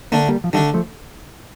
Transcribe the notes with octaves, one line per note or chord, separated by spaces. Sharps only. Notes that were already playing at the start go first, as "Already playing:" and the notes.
D3 A3 A#3 D4
G3 A#3
F3
D3 D#3 G3 A3 D4
F3 A3